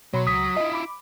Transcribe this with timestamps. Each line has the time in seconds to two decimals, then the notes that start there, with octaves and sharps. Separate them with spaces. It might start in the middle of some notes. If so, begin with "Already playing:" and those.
0.14 B2 F#3 C#5 B5 C6
0.27 C#2 D#6 B6
0.57 E4 F4 D#5
0.73 B5 D6